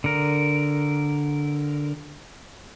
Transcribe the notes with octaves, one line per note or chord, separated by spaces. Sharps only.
D3 A#4